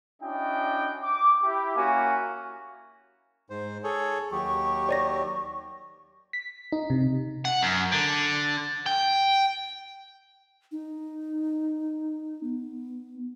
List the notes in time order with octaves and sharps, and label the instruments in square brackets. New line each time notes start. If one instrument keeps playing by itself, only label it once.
[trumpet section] C#4 D4 E4 F#4 D#5 G5
D6
E4 G4
A#3 C#4 E4 F#4 F5 G#5
[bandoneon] G#2 C5
G#4 A4 C#5
[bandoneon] D#2 F#3 G4 [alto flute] C#6
[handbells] C#5 D5 A#6
[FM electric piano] B6
D#4
C3
[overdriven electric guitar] F#5
F#2
D3
G5
[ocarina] D#4
B3